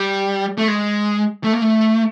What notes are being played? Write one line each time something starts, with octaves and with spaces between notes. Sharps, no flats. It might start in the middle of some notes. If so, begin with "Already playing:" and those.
Already playing: G3
A3
G#3
A3
A#3
A3